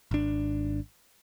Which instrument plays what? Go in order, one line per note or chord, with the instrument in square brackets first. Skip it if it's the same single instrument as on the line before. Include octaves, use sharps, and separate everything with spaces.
[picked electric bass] G#1 D4